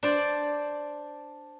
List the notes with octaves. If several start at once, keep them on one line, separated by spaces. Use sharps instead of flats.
D4 C5 D5